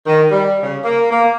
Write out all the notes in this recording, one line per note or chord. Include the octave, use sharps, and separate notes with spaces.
D#3
G3
C#3
A#3
A#3